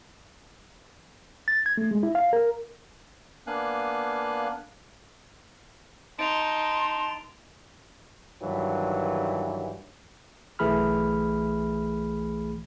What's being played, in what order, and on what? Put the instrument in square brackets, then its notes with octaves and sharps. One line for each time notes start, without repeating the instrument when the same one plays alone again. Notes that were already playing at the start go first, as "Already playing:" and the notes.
[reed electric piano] A6
G#6
A3
G#3
E4
F5
A#4
[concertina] A#3 B3 D4 F5 G#5 F#6
[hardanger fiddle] D#4 [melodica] A5 [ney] C6 [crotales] D7 F7
[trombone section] G2 D#3 E3 F#3
[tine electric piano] B1 E3 A3 G#4 B5 F6